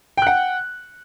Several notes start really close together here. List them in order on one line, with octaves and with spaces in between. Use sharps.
G5 F#6 F#5